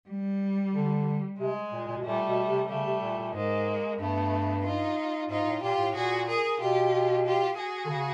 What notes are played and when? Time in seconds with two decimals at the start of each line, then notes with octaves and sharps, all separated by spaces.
0.09 G3
0.73 D3
1.39 C3 G#3
1.72 A#2
1.88 A#2
1.98 B2
2.04 A#2 G3 A3
2.26 B2
2.47 C3
2.69 C#3 G3 A3
2.85 C3
3.02 A#2
3.18 A#2
3.34 G#2 G#3 A#3
3.99 G2 A3 B3
4.64 D#4 F4
5.29 G#2 D#4 F4
5.46 A2
5.62 A#2 F4 G4
5.79 A2
5.94 A#2 F#4 G#4
6.27 G#4 A#4
6.60 B2 F4 G4
7.25 F4 G4
7.57 F#4 G#4
7.85 D3
7.90 C#3